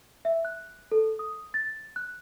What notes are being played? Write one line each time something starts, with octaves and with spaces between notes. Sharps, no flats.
E5
F#6
A4
D#6
A6
F#6